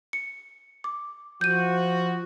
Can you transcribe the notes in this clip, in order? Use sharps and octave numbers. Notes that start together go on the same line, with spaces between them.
C#7
D6
F3 F#4 G6 D#7